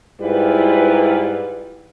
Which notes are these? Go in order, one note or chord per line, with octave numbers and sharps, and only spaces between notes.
G#2 G3 E4 F4 B4